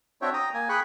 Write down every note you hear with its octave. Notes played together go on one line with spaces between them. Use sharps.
C4 D4 F#4 C#5 E5 G5
G5 A#5 D#6
A#3 G#5
G#4 G5 B5 C#6 F#6